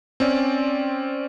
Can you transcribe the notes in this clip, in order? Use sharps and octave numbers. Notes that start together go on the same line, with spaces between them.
C4 C#4 D5